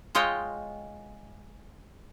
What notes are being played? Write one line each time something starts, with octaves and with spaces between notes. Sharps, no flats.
G#3 F4 C#5 D#5 G5